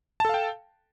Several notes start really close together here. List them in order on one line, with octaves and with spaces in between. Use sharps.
A5 A4 F5 G5